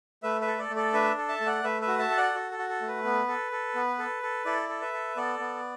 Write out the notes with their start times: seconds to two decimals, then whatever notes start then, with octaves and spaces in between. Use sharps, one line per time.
0.23 A3 B4 E5
0.41 B4 E5
0.47 A4
0.58 A4 D5
0.70 A3
0.76 A4 D5
0.93 D4 B4 E5
1.18 A4
1.28 E5 A5
1.41 A3
1.46 D5 F#5
1.64 A3 B4 E5
1.81 B4 E5
1.87 F#4
1.99 E5 A5
2.10 A4
2.17 D5 F#5
2.35 F#4
2.51 A4
2.59 F#4
2.69 A4
2.81 A3
2.88 B4
3.04 B3
3.28 A4
3.52 A4
3.75 B3
3.99 A4
4.23 A4
4.45 E4 A4 D5
4.69 A4
4.81 B4 E5
4.93 A4
5.16 B3 A4 D5
5.39 B3